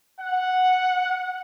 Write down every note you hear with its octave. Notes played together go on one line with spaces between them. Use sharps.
F#5